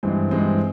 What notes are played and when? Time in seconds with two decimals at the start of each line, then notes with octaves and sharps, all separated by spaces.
0.03 G2 E3 G#3 C4
0.31 G2 E3 G#3 C4